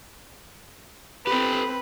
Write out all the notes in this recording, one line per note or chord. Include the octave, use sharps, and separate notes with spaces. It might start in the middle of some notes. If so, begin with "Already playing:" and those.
C4 G4 A4 B4